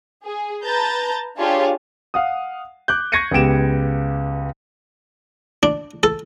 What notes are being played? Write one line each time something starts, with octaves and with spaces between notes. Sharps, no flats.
G#4
B4 A5 A#5 G6 A6
D4 F4 G4 G#4 C#5 A5
F5 F#5 D#6
D6 F#6 G6
C#6 G#6 A#6 C7 C#7 D#7
C#2 B3 G4 D7 E7
D4
A4